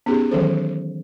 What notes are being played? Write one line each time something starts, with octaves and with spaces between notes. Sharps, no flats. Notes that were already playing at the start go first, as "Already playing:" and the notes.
B3 C#4 D#4 G4 G#4
D#3 E3 F#3 C#4 A4 C5